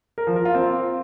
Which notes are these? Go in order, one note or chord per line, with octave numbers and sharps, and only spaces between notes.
A#4
F3
A#4
F4
C4